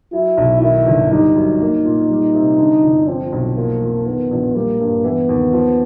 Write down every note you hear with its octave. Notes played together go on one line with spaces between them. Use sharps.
F#3 E4
B1
D#3 E4
G1
G3 D#4
F#2
A#3
A#2
G3
C3
D3
G1
F3 C4
B1
F3 A#3
F2
D#3 B3
A#1
G3 A#3
G2
E3 B3
D#2
F3